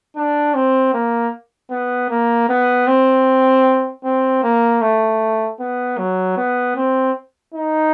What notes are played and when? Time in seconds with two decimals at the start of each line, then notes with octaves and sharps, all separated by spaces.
0.16 D4
0.54 C4
0.94 A#3
1.71 B3
2.10 A#3
2.49 B3
2.87 C4
4.04 C4
4.43 A#3
4.81 A3
5.60 B3
5.98 F#3
6.37 B3
6.76 C4
7.54 D#4